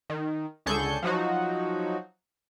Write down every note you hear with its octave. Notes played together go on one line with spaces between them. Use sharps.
D#3
C#2 D3 G#4 A4 C#6 G6
F3 F#3 D#4 F#4